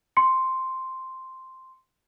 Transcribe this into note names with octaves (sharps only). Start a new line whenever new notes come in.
C6 C#7